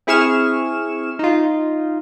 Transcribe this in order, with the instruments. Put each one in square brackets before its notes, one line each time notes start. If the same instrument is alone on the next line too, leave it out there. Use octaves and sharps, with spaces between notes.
[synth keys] C4 E4 G#4 C#6 F6 E7
D#4 F4